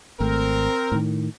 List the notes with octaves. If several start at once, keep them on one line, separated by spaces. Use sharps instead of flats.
G#1 A3 C4 A#4
A2 D#3